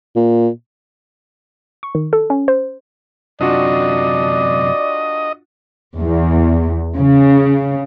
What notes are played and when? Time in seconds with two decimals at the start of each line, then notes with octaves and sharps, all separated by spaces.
0.16 A#2
1.83 C#6
1.95 D#3
2.13 A4
2.30 C#4
2.48 C5
3.41 F#2 C3 D4 F4 F#4 D5 D#5
5.97 E2
6.98 C#3